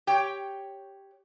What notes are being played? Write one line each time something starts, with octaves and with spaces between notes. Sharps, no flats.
G4 C#5 G5